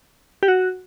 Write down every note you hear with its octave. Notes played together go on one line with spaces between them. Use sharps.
G4
F#4